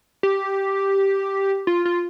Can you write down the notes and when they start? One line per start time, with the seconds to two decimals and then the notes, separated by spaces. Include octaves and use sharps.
0.23 G4
1.67 F4
1.85 F4